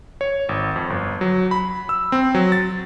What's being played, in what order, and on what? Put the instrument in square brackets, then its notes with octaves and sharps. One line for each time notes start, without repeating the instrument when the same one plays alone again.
[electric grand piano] C#5
G#1
F2
G1
F#3
B5
E6
C4
F#3
A6